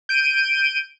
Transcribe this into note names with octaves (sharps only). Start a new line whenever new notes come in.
G6 D7 D#7